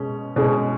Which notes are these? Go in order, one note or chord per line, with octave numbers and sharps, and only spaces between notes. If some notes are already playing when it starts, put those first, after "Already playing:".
Already playing: B2 G#3 C#4
B2 G#3 C#4